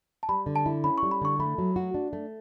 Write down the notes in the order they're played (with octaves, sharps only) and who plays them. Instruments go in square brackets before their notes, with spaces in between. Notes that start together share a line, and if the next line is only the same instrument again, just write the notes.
[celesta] A5
[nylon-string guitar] G3 [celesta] B5
[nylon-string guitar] D3
[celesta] A5
[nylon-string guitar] E4
[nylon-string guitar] C#4 [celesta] B5
[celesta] C#6
[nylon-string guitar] G3
[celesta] B5
[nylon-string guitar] D3 [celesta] C#6
[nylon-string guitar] A3 [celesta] B5
[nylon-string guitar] F#3
F#4
D4
A3